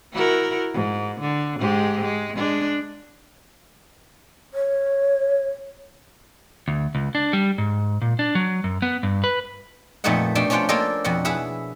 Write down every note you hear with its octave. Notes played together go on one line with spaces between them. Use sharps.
E4 F#4 A#4
G#2
D3
G#2 G#3 G4
G#3
G#3 D4
C#5
D2
C#2
D4
G3
G#2
A#2
D4
F#3
F#2
B3
G2
B4
F2 A#2 A3 B3 D#4 F#5
B2 A3 D4 G5
C#4 D4 F4 C5 F#5 G5
A#3 D4 F4 A4 D#5 G5
F2 B2 F#5
E4 G#4 B4 E5 F#5